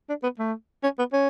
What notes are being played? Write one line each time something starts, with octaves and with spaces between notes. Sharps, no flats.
D4
B3
A3
C#4
B3
C#4